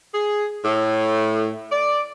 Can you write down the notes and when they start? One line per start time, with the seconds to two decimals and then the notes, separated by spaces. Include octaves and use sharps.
0.13 G#4
0.65 A2
1.71 D5